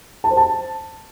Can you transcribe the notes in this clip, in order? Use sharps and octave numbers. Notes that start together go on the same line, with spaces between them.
A5
C5
A5